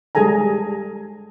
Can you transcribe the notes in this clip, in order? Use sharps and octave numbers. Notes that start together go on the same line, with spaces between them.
G3 G#3 G#4 A4 G#5 A#5